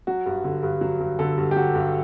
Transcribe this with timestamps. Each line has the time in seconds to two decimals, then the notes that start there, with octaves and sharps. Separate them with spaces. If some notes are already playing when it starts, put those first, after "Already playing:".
0.07 F#3 F#4
0.26 G2
0.44 D3
0.63 G2
0.81 F#3
1.00 G2
1.19 D3 A4
1.38 G2
1.51 G4
1.56 F#3 F#4
1.75 G2